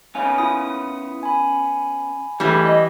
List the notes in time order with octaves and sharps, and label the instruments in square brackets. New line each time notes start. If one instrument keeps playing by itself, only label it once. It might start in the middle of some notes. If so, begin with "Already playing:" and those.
[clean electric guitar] B3 C#4 F5 [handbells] G#5
[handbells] E4 D#6
G#5 B5
[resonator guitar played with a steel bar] E3 G3 [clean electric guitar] A3 E4 G#4
[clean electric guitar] D#5